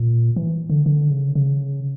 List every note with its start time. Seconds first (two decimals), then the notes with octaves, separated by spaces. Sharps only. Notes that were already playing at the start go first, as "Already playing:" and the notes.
Already playing: A#2
0.36 E3
0.70 D3
0.86 D3
1.10 C#3
1.35 C#3